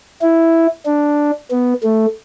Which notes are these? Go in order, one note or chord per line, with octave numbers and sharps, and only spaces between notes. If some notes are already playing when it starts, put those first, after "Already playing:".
E4
D4
B3
A3